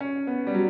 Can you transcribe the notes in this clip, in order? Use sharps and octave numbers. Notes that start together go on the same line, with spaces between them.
C#4
B3
G3
F#3